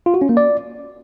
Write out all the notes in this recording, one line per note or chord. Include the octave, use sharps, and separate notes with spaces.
F4
F#4
C#4
A#3
D5